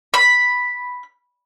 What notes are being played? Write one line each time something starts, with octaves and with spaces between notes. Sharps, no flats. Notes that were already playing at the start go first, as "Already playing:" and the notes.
B5